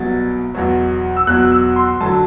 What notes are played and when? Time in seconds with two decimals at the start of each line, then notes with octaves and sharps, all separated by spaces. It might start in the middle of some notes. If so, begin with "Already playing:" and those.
Already playing: C2 B2 F#3 A6
0.55 E2 B2 F#3
1.17 E6
1.27 E2 B2 F#3 F#6
1.52 E6
1.76 C6
2.01 F#2 D3 F#3 A5